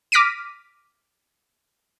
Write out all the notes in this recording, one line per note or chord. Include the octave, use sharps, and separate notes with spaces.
D6 F6 A#6 B6 D7 D#7